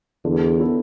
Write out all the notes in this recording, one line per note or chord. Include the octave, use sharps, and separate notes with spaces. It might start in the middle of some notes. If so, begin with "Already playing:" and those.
E2 D3
B3 E4 A4